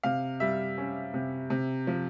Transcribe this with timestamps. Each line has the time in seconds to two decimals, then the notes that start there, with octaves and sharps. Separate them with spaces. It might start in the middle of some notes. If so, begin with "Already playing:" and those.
0.03 C3 F5
0.40 G3 E5
0.78 C#4
1.14 C3
1.50 C3
1.87 F3